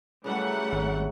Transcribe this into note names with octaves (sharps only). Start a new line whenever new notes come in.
C#3 E3 F#3 G3 A3 F#5
G#1 F#3 E5